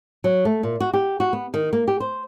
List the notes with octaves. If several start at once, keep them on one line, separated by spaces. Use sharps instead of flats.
F#3
A3
A#2
F#4
G4
F#4
B3
D#3
A#3
G4
C5